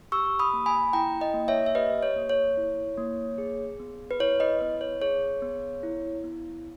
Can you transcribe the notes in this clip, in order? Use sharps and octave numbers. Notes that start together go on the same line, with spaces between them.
G4 C#6 E6
B5 D#6
A#3
G#5 B5
E4 G5 A#5
D#5 G5
A#3
C#5 E5
E5
G4 B4 D#5
C#5
A#3
C#5
E4
A#3
G#4
B3
B4
E4 C#5
B4 D#5
B3 B4
C#5
G#4 C#5
B3
E4
B3